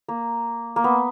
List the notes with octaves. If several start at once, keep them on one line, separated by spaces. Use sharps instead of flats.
A#3
A#3
B3